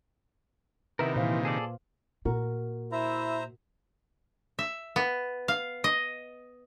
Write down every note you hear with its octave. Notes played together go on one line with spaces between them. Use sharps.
C3 D#3 B3 E4 A#4 B4
A#2 E3 C5 F5
G#4 A4 D5
A#2 F#4 A#4
E4 C5 E5 A#5
E5
B3
F5
D#5